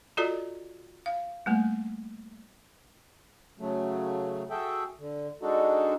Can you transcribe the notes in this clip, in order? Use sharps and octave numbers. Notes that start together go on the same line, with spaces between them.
F4 F#4 A4 D5 D#5 A#5
F5
G3 A3 A#3
C#3 F#3 A3
F#4 G#4 A4 E5 G5
D3
G#3 D4 D#4 F#4 A4